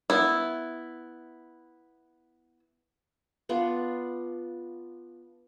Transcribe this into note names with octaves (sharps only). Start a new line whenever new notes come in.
B3 E4
B3 D4 F4